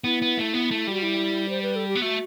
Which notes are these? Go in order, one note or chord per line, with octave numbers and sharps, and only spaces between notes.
B3 E4
B3
A3
B3
A3
G3 F#4
E4
C5
B4
A4
G4
B3
A3 F#4